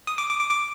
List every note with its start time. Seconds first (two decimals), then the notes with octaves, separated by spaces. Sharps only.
0.07 D#6
0.18 D6
0.29 D6
0.39 D6
0.50 D6